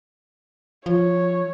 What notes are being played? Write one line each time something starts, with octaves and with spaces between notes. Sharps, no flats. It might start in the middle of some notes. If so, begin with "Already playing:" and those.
F3 C#5